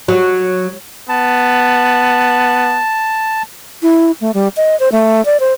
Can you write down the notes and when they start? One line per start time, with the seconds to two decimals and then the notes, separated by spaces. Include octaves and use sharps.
0.08 F#3
1.09 B3 A5
3.83 E4
4.21 A3
4.34 G3
4.57 D#5
4.80 C5
4.92 A3
5.25 D5
5.40 C5